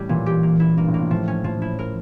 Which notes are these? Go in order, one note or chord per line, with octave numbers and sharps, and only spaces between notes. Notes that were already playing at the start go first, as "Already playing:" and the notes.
Already playing: A2 G3 A3 C#4
A#2 E3
G4
A#3
E4
G2 A#3
A2
A#3
A#2
A2 F3
C#4
A2 F3
E4
A#4